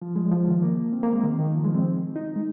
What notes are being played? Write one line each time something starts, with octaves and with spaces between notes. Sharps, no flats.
F3
G#3
F3
D#3
A#3
C4
A#3
G#3
D#3
D#3
F3
G#3
C4
D#4
G#3